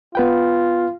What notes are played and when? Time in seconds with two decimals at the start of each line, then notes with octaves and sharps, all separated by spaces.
0.15 B3 F4 B4 G5